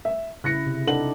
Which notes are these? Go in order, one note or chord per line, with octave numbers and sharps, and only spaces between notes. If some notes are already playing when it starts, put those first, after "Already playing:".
E5
C#3 E4 F#6 A#6 C#7
C3
D4 D#4 A4 F#5 F#7